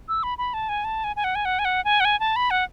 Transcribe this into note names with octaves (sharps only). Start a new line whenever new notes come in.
E6
B5
B5
A5
G#5
A5
G#5
G#5
F#5
G#5
F#5
G#5
F#5
G#5
F#5
G#5
A5
B5
F#5